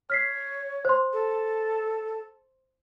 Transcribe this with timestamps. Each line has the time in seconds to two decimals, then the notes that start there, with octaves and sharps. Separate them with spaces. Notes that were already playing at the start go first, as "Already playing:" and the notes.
0.10 C#5 F6 B6 C7
0.85 C5 C6
1.13 A4